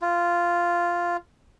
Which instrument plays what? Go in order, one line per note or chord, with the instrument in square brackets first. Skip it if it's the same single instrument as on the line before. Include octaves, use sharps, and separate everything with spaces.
[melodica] F4